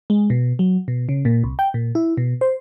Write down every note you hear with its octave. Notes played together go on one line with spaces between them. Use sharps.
G#3
B2
F#3
B2
C#3
A#2
C2
G5
A#2
E4
B2
C5